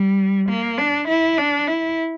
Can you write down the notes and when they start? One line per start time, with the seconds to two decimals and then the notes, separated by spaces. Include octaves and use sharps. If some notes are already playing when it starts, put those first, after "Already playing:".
Already playing: G3
0.49 A#3
0.78 D4
1.08 E4
1.38 D4
1.67 E4